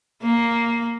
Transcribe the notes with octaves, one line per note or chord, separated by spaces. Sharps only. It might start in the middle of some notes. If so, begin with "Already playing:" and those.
A#3